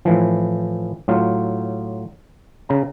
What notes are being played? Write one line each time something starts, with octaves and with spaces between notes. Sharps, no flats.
A2 E3 F3
A2 F#3 F4
C#3 A#5